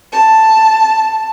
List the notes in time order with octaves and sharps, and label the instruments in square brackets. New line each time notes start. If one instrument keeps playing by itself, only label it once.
[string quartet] A5